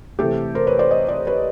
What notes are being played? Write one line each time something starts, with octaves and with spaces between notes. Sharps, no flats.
C3 E3 A3 G4 A4
A#4 C5
B4 C#5
C5 D5
C#5 D#5
C5 D5
B4 C#5